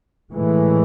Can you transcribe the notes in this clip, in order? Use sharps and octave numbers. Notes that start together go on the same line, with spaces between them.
A2 E3 G#3